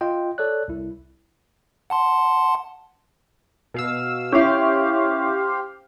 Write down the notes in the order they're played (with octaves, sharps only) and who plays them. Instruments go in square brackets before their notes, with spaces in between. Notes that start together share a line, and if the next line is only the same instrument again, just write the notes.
[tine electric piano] F4 D#5 G5
A4 C#5 D5 F#6
C2 E4
[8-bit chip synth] F#5 A5 C6
[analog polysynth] B2 F5 E6
[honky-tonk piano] C#4 E4 [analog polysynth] G4 C5 F5